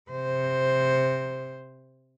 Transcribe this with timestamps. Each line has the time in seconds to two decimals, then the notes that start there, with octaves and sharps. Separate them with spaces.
0.11 C3 C5